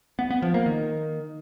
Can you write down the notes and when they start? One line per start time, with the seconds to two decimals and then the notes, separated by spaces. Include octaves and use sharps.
0.19 B3
0.31 B3
0.42 F3
0.54 A#3
0.66 D#3